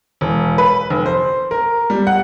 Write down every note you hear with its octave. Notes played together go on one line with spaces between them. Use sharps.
E1
B4
F1
C5
A#4
G3
F#5